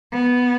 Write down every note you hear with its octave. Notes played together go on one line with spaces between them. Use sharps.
B3